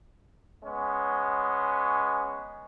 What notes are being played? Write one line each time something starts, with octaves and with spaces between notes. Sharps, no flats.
G#3 B3 C#4